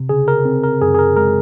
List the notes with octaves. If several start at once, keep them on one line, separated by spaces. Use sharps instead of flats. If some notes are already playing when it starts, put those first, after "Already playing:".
Already playing: C3
C#3 G#4
A#4
C4
A#4
F#2 G#4
G#4
A#4
G#3 A#4